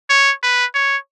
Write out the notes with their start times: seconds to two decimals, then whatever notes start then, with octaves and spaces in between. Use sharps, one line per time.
0.10 C#5
0.43 B4
0.74 C#5